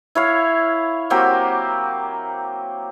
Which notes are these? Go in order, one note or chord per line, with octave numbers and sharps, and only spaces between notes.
E4 C#5 F5
F#3 A#3 C4 G4